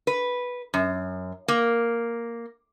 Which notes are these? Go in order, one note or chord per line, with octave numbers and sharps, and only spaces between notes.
B4
F#2
A#3